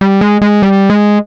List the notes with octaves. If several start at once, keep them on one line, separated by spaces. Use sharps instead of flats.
G3
G#3
G#3
G3
G#3